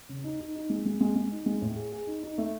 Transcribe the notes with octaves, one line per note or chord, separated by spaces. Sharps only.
C#3
D#4
D#4
D#4
G#3
G#3
G#3
G#3
D#4
G#3
A2
G#4
G#4
D#4
D#4
A3